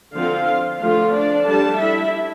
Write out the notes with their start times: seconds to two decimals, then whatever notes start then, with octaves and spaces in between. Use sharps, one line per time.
0.15 D3 F3 C4 F4 F5
0.81 D3 F3 A3 F4 F5
1.14 D4 D5
1.46 G3 D4 A4 A5
1.79 E4 E5